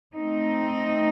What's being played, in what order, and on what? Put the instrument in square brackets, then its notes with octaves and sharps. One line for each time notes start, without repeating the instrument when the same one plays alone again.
[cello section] A3 C4 D#4